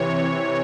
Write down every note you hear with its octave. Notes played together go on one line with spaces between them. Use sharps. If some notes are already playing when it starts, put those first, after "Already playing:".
Already playing: C3 E3 C#5